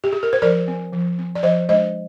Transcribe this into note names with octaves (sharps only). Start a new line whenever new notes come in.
G4
G#4
A#4
C5
F3 A#4 D5
C4
F3
C4
D5
F3 C5 D#5
G#3 D4 C5 D#5